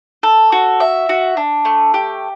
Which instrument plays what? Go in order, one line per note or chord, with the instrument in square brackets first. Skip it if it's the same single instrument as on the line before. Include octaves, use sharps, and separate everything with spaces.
[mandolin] A4
F#4
E5
F#4
D4
A3
G4